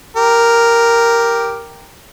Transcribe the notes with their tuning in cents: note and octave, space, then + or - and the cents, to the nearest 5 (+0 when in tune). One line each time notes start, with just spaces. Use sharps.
G4 +0 A#4 +0